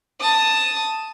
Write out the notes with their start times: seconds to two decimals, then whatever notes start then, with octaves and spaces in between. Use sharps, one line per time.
0.21 A5 D#6